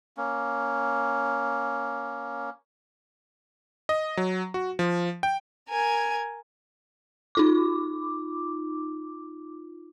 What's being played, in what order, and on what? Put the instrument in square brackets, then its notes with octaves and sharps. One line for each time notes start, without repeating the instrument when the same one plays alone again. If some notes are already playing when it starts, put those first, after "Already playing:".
[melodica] A#3 C#4
[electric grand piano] D#5
F#3
F#4
F3
G5
[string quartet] A#4 G#6 [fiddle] G#5
[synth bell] D#4 F4 D6